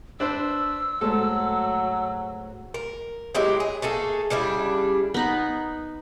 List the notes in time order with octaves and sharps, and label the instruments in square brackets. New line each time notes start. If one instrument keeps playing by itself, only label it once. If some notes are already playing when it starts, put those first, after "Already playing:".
[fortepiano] D4 B4 C5 [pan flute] E6
[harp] G#2 G#3 A3 [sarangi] F#3 [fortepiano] A4
[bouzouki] A#4
F#3 G#3 E4 G4
G#4
A3 A#3 G#4 A4
C#3 G3 D4 E4
[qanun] B3 D#4 B5